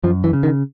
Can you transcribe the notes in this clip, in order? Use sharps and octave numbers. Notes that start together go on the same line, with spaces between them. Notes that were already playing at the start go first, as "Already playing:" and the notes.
F#2 F3
E3
C#3
D#3